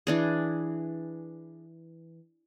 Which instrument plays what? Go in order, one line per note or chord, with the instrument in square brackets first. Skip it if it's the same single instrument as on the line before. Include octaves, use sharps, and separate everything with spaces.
[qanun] E3 D4 G#4